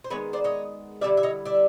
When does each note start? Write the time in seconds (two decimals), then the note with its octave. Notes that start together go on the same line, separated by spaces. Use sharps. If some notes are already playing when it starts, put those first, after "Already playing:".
0.04 C5
0.10 D#3 G#3 B3 B4 C#5
0.33 C5 D5
0.44 C#5 D#5
1.01 D3 G3 C4 E4 D5 E5
1.17 E5
1.23 C#5 D#5
1.45 D5 E5